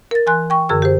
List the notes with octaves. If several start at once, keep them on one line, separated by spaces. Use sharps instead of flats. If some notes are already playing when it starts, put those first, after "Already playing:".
A#4 A6
E3 G#5 C6 F#6
G5 C#6
F#2 D3 G#4 A#4 E6
G4 C5